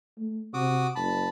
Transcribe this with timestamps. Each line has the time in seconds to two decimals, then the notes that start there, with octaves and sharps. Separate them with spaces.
0.18 A3
0.54 C3 F#4 D6 D#6
0.96 F#1 A5 B5